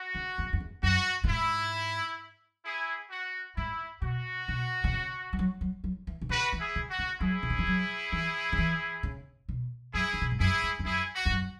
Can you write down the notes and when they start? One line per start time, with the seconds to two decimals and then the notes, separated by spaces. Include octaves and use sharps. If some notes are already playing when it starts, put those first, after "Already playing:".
Already playing: F#4
0.15 C#3
0.38 F#2
0.45 E2
0.53 F#2
0.60 E2
0.83 F#2 F#4
1.24 B2
1.29 G#2 E4
2.65 E4 G#4
3.10 F#4
3.56 G#2 E4
4.02 B2 F#4
4.48 B2
4.84 B2
4.93 C#3
5.33 G#3
5.39 F#3
5.61 F#3
5.84 F#3
6.07 E3
6.21 B2
6.29 C#3 F#4 B4
6.53 E3
6.60 E4 G#4
6.76 C#3
6.91 F#4
6.99 C#3
7.20 F#3 E4 G#4
7.43 B2
7.50 C#3
7.59 E3
7.67 F#3
8.12 E3
8.52 C#3
8.58 E3
9.03 C#3
9.49 B2
9.94 F#2 E4 G#4
10.13 C#3
10.21 B2
10.31 G#2
10.39 F#2 E4 G#4
10.63 G#2
10.79 E2
10.85 F#2 E4 G#4
11.15 F#4
11.25 E2
11.31 F#2